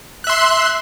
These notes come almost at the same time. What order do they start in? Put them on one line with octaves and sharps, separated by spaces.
F#6 E5 C6